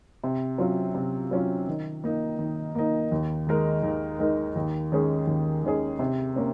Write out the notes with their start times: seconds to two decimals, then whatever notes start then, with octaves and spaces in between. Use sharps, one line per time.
0.24 C3
0.58 F#3 C#4 F4
0.95 C3
1.31 F#3 C#4 F4
1.68 D#3
2.04 A#3 D#4
2.39 D#3
2.75 A#3 D#4
3.12 D#2
3.47 D#3 G#3 D#4 A#4
3.83 D#2
4.19 D#3 G#3 D#4 A#4
4.56 D#2
4.92 D#3 G#3 C#4 G#4
5.27 D#2
5.64 D#3 G#3 C#4 G#4
5.99 C3
6.36 A#3 C#4